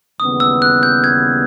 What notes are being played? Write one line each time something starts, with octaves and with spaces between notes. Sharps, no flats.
D#2 C#3 E3 G3 B3 D#6
E6
F#6
G6
G#6